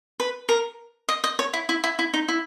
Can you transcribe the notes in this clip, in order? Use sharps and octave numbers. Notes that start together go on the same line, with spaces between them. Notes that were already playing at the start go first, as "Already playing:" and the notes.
B4
A#4
D#5
D#5
C#5
E4
E4
E4
E4
D#4
E4